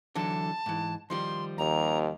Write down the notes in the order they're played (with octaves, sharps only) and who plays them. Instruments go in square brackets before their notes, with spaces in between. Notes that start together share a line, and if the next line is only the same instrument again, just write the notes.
[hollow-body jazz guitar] D3 E3 F#3 [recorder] A5
[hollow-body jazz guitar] G#2 E3
[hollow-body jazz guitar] D#3 F3 G3 [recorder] C6
[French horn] D#2 [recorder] A#5